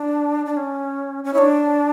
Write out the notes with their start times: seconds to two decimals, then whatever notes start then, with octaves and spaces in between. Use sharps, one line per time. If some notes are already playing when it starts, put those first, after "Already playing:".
Already playing: D4
0.46 D4
0.57 C#4
1.24 C#4
1.33 E4 C#5
1.38 D4